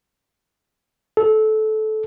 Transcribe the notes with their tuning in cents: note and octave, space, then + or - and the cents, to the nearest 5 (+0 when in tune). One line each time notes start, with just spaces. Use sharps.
A4 -20